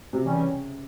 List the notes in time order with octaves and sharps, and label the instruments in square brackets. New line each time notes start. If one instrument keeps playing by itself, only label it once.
[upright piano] C3
[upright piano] C#3 [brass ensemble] E3 G3 C#4